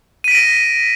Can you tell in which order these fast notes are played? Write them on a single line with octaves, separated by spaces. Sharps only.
D#7 B6 D7 A#6